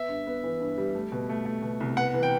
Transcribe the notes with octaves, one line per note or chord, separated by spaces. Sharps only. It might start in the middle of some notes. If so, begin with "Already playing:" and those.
Already playing: B3 E5
G2
B3
E3
G2
G3
A3
B2
A3
A3
B2
C2
B3 F#5
E3
G5